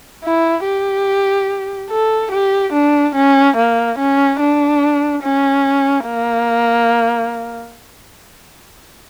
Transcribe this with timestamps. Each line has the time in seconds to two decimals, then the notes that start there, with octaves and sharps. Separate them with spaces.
0.24 E4
0.65 G4
1.90 A4
2.31 G4
2.73 D4
3.15 C#4
3.56 A#3
3.98 C#4
4.40 D4
5.23 C#4
6.06 A#3